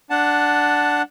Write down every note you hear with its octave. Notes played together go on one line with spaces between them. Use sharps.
D4 F#5 A5